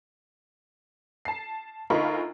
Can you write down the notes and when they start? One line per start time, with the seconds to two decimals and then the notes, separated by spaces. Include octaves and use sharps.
1.25 A5 C7
1.90 D2 D#4 F4 A#4 B5 C#6